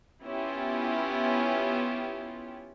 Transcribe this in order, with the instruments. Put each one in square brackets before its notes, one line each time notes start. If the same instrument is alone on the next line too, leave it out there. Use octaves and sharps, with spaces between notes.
[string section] B3 C#4 E4 F4 G4